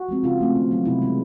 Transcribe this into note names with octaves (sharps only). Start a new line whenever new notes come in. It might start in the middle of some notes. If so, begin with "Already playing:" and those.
Already playing: F#4
F3 G#3 C4
C#3 F4
F3 A3 C4
D#3
F#3 B3
C3 E4
E3 G#3